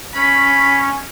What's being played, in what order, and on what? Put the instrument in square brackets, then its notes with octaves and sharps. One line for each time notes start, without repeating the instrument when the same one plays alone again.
[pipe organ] C#4 [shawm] B5